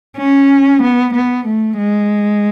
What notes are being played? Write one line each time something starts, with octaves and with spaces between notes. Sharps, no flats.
C#4
B3
B3
A3
G#3